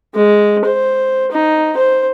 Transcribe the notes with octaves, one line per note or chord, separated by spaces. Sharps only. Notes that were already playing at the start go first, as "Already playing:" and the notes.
G#3
C5
D#4
C5